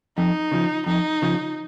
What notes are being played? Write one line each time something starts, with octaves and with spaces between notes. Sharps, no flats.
F2 D#4
C#3 F3
F2 D#4
C#3 F3